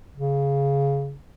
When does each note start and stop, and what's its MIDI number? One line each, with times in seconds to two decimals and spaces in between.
0.15 1.16 49